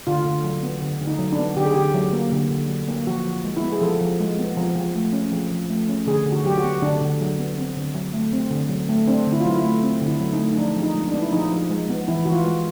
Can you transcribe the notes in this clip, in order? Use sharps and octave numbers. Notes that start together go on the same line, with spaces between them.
D3 F4
D3
F#3
B3
D3
D3
D#4
F#3
D4
B3
D3 G4
G#4
D3 G4
F#3
A#3
D3
D3
F#3
A#3
F3 F#4
F3
G#3
E4
B3
G#4
F3 A4
F3
G#3
B3
F3
F3
A3
C#4
F3
F3
A3
C#4
D3 G#4
D3
F#4
F#3 G4
F#4
B3
D3 D4
D3
F#3
B3
C4
D3
F#3
A3
C4
D3
F#3
A3
C4 D4
D3
E4
F4
F#3 E4
E4
A3
C4
D3
E4
F#3
D#4
A3
D#4
F3 D4
F3
D#4
G#3
D4
B3
E4
F3 D#4
F3
G#3
B3
E3 E4
E3 F#4
F4
G#3